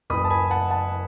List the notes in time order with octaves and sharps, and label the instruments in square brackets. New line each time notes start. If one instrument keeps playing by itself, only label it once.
[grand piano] F#1 F#2 E3 B5 D#6
A5
G#5 B5
F#5 A5
F#5 A5